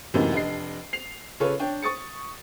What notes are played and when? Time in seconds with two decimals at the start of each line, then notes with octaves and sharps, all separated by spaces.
0.14 F#2 A2 C3 E3 A#3 D#4
0.32 F1 D4 D#5 C7
0.93 C7 F7
1.40 C#3 F4 A4 B4 C#5
1.59 D4 C#5 G5
1.83 C#6 D#6 A6 C#7